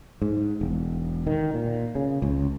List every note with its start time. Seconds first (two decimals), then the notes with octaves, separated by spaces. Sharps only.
0.22 G#2
0.61 E1
1.27 D#3
1.54 A#2
1.95 C#3
2.22 C#2